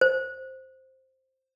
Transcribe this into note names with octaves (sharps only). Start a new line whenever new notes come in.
C5